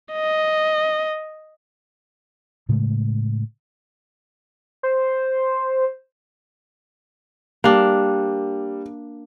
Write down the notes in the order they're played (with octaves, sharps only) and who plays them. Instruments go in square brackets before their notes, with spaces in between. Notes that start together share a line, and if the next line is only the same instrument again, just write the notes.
[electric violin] D#5
[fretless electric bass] A2 C#3 G#3 A3
[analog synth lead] C5
[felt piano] G3 [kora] A#3 D4